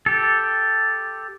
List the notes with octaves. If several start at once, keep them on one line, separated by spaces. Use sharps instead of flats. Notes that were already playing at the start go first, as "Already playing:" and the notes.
G4 A4